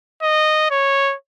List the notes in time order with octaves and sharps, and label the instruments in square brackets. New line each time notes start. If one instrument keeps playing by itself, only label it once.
[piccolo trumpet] D#5
C#5